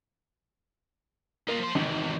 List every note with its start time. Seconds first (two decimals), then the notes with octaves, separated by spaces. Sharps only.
1.48 A#3 D#4 F4
1.61 F3 C6
1.75 G#1 E2 C3